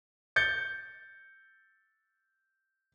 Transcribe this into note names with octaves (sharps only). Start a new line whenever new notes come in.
G6 A6 C#7